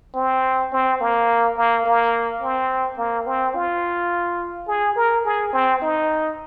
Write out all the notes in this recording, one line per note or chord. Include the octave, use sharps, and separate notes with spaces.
C4
C4
A#3
A#3
A#3
C4
A#3
C4
F4
G#4
A#4
G#4
C4
D#4